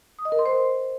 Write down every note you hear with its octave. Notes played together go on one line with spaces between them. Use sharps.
D#6
D#5
A#4
C6
C5